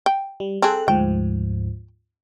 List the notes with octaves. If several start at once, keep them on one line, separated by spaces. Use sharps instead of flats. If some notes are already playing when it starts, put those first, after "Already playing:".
G5
G3
C4 G#4 A4 F#6
D2 G#2 F3 G5